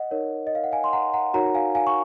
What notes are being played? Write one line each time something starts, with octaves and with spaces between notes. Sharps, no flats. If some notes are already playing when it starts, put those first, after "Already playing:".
Already playing: D#5 F#5
D#4 A#4 C#5
D#5
F5
F#5
F5 G#5
C6
F#5 A#5
F#5 A#5
D#4 F#4 A#4 C#5 F#5 A#5
F5 G#5
F5 G#5
C#6